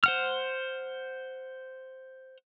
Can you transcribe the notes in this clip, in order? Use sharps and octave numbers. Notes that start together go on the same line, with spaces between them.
C5 F#5 F6